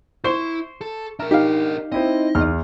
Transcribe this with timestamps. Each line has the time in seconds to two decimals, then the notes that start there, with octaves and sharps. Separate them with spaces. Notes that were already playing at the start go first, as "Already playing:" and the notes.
0.24 E4 C5 C#6 G7
0.81 A4
1.19 D4 A#4 E5 A#5 F6
1.31 D#4 G4 F5
1.92 C4 E4 C5 D#5
2.35 E2 F6